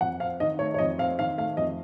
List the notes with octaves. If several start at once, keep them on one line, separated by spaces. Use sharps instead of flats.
F2 F#5
C4 F5
D#3 D#5
A3 C#5
C#5
F2 D#5
C4 F5
D#3 F5
A3 F5
F2 D#5